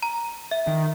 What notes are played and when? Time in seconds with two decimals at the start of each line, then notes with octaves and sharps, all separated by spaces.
0.03 A#5
0.51 E5
0.67 D#3